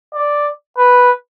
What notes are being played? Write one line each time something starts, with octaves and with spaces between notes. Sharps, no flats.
D5
B4